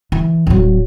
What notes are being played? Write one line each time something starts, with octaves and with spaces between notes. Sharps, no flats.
E3
D1 F#3